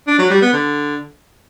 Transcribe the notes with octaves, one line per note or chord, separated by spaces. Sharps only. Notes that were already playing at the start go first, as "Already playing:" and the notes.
D4
F#3
G3
B3
D3